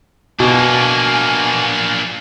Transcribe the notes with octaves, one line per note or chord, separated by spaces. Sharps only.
B2 A#3 D4 G#5